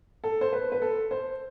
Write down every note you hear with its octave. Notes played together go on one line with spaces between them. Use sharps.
A4
C5
B4
B4
A4
C5